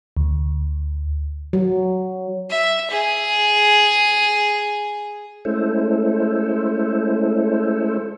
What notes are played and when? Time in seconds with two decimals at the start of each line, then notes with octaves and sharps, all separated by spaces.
0.17 D2
1.53 F#3
2.50 E5
2.90 G#4
5.45 G#3 A3 C#4 E4 A4 C5